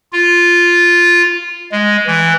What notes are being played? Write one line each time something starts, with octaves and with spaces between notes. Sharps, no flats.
F4
G#3
E3